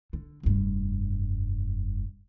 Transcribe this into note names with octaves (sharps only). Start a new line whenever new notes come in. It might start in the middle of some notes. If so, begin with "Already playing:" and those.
D3
F1 G2